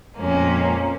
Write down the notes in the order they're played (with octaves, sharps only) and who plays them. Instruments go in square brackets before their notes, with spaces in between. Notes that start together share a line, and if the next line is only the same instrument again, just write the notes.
[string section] F2 A#2 [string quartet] G#3 A#3 C#4